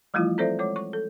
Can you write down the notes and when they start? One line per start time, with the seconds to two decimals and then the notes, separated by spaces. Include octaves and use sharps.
0.14 E3 F3 G3 A3 E4 F4
0.38 C4 A4 C5 D5 E5
0.59 G#3 C#5 D6
0.76 C#6
0.93 A4